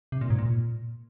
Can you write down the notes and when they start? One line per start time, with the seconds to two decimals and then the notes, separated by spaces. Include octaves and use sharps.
0.12 C3
0.21 A#2
0.30 G#2
0.39 A#2